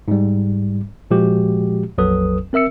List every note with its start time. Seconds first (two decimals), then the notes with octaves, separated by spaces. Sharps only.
0.08 G#2 G3
1.11 A#2 F3 G#3 F#4 G4
1.98 A#1 F2 F#3 A4 B4 D#6
2.53 C4 A#4 E5 E6 C#7